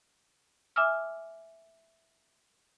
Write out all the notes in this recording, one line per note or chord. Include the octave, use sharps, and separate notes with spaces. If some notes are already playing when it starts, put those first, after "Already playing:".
E5 G#5 D6 E6 F6